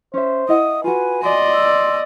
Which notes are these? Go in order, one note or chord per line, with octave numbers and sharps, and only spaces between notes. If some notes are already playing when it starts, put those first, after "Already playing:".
C#4 C5 E5
E4 D#5 F#5 D#6
F4 F#4 B4 G#5
D5 D#5 C6
E6